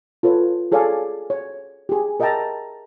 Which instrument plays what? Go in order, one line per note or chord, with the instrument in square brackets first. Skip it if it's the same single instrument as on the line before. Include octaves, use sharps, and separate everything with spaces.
[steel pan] F4 A4 B4 C#5
G#4 A4 C#5 D5 F5 G#5
C#5
G4 G#4
A#4 D#5 E5 G5 A5 A#5